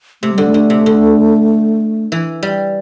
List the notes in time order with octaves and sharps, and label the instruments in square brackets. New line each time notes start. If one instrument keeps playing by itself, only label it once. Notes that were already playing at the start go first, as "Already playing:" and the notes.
[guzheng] C3 [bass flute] A3
[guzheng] D3 [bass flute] G3
[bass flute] A3
[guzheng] D3
C3
D3
E3
G3